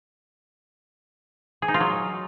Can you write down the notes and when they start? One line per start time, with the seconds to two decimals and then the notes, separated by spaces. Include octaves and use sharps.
1.62 G#4
1.68 D#4
1.74 F4
1.80 F#3